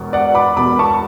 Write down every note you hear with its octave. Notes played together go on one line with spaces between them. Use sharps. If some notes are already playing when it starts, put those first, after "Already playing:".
Already playing: E1 E2 B2
D5 F#5
B5 D6
E1 E2 B2 B5 D6
A5 C#6